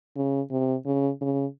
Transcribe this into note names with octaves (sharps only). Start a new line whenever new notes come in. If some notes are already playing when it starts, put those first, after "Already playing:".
C#3
C3
C#3
C#3